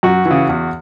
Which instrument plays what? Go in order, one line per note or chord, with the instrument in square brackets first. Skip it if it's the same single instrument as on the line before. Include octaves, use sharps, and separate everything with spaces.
[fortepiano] F#2 F#4
E3
C#3
E2